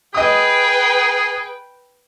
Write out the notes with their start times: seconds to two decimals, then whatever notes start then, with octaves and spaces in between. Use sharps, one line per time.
0.14 G#4 B4 D#5 G5 D#6